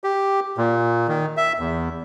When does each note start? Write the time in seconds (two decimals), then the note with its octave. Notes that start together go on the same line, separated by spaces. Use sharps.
0.04 G4
0.57 A#2
1.08 D#3
1.37 E5
1.59 E2